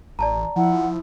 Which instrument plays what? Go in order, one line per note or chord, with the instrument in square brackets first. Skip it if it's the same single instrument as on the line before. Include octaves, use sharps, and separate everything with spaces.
[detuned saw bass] A1 [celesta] D5 A5 A#5
[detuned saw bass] F3 [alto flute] E4 [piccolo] F#5